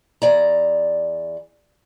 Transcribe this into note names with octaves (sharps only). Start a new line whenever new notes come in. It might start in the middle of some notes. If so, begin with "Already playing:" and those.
E2 D5 A#5